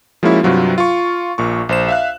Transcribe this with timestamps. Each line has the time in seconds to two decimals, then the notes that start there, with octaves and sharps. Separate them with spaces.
0.23 F3 G#3 A#3 C#4 E4 F#4
0.43 G2 C3 F#3 F4
0.78 F4 C#6
1.38 A#1 A#2 C#6
1.69 A#1 C5 E7
1.89 E5 F5 F#6